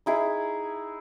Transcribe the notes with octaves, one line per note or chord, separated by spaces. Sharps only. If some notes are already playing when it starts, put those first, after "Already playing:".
D#4 E4 G#4